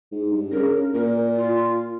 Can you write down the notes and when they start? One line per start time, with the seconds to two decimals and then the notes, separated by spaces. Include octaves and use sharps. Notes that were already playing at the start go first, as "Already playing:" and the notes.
0.12 G#2
0.32 G2
0.52 C#3 A#4
0.93 A#2 A#4
1.36 F4